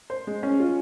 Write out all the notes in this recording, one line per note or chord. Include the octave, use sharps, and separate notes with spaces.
C5
G#3
C#4
F4